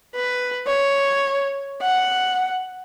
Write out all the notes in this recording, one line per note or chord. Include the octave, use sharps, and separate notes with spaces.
B4
C#5
F#5